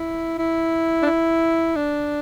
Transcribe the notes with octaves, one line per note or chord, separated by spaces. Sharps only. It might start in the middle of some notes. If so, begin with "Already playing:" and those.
Already playing: E4
E4
D4
E4
D4